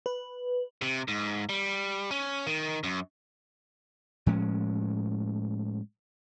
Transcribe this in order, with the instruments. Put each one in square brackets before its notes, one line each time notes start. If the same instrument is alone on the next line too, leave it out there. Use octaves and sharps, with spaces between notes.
[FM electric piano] B4
[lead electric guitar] C3
G#2
G3
C#4
D#3
F#2
[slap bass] A2 F3 G#3 C#4